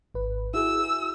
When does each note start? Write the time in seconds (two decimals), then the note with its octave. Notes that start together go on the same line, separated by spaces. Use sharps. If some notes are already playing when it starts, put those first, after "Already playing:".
0.15 G#1 B4
0.54 E4 F#4 G#4 E6